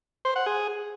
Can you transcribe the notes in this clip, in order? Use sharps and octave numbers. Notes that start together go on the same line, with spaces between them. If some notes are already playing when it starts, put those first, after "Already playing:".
C5
F#5
G#4